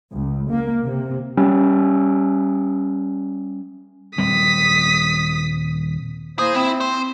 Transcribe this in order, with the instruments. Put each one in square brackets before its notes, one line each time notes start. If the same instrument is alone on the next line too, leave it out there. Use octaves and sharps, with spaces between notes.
[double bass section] C#2
A#3
C3
[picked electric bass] G3 C#4
[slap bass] D#1 G3 C4 [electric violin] D#6 B6
[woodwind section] A#3 E4 C5 [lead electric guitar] G#4
[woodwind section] C4 [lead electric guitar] E4
[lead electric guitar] C5